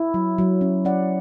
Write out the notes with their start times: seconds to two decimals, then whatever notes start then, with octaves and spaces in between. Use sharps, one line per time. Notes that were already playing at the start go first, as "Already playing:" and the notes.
Already playing: E4
0.14 F#3
0.38 F#3
0.61 C#4
0.85 C#4 D5 F#5